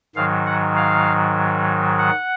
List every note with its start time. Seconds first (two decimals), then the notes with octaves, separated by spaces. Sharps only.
0.16 G#2 D#3 F#3 F5
0.46 F#5
0.76 F5
1.98 F#5